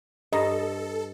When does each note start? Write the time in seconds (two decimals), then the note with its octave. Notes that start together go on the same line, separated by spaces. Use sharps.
0.33 G2 A4 D#5 A#5